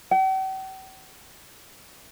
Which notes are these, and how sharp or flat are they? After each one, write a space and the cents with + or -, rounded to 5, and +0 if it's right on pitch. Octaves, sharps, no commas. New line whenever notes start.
G5 -45